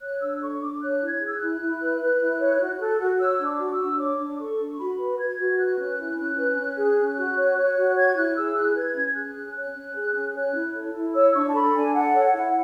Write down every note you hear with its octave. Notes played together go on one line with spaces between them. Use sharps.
C#5 F#6
D4 E6
A4 C#6
D4 D6
C#5 F#6
E4
G#6
G#4
E6
F#6
E4
E4
B4
B4
E4
C#5
F#4
A4
F#4
C#5 E6
D4
D6
F#4
E6
D4
C#5 D6
D4
A4 C#6
D4
F#4 B5
B4
B4 G#6
F#4
B4 F#6
C#4
E4
C#4
B4
C#4
G#4
C#4
F#4
C#5
C#5
F#4
C#5 G#6
E4 F#6
G#4 E6
E4 F#6
B4 G#6
C#4
G#4 F#6
C#4
C#5 F#6
C#4
G#4
C#4
C#5 F#6
E4
A4
E4
C#5 E6
D4 C#6
A5
A4 B5
D4 G#5
A4 F#5
C#5
E4 F#5